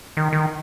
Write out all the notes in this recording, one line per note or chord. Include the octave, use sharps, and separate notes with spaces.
D#3
D#3